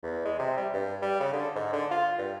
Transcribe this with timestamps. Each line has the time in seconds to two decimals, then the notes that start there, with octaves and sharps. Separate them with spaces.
0.03 E2
0.25 G#3
0.39 C3
0.57 G3
0.73 G2
1.02 G3
1.20 C#3
1.33 D3
1.55 G#2
1.73 D3
1.91 F4
2.18 G2